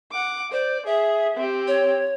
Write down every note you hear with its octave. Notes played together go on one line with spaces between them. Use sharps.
F#5 D6
C5 D5
G#4 E5
C4 G4
C#5